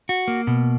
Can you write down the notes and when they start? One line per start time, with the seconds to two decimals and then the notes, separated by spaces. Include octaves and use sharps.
0.09 F#4
0.28 A#3
0.47 B2